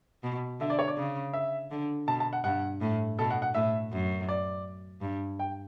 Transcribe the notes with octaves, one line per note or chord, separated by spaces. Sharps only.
B2
D3 E5
D5
C#5
D5
C#3
E5
D3
B2 A5
A5
F#5
G2 F#5
A2
B2 A4
F#5
F#5
A2 E5
F#2
D5
G2
G5